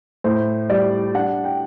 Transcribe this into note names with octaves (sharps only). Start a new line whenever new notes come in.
A2 C5
G3 D5
D4 F#5
G5